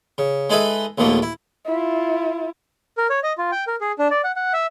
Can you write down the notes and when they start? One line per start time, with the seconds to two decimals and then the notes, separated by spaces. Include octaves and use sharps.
0.18 C#3
0.50 G#3 D#4 G#4 A4 B4 E5
0.98 A#1 D#2 B2 A3 A#3
1.22 E4
1.66 E4 F4
2.98 A#4
3.10 C#5
3.23 D#5
3.38 F4
3.52 G5
3.67 A#4
3.81 G#4
3.99 D4
4.10 D5
4.24 F#5
4.36 F#5
4.53 E5